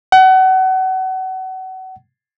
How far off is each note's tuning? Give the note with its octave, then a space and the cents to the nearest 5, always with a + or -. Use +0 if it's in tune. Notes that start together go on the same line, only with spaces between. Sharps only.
F#5 +30